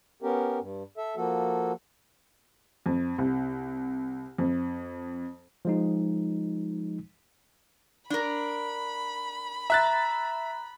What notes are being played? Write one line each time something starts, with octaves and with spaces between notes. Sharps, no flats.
B3 C#4 G4 A#4
G2
A4 E5
F3 A#3 F#4 A4
F2
C2
F2
F3 G#3 D#4
D4 A#4 B5
E5 A#5 F#6 A6